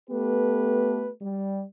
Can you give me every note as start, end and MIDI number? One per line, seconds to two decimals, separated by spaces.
0.10 1.09 57
0.10 1.09 59
0.10 1.09 67
0.10 1.09 69
0.10 1.09 71
1.21 1.63 55